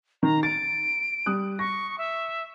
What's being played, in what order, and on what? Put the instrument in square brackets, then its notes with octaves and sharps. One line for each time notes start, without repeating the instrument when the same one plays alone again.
[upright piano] D#3 [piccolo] A#5
[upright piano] A6 [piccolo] D7
[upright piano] G3 D#6 F#6
[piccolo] C#6 [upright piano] A#6
[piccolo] E5